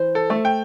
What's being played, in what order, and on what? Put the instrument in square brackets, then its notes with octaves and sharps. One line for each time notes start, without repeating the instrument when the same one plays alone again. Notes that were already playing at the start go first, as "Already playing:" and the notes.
Already playing: [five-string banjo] E3 C5
[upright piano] A4
[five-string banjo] A3
[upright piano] G5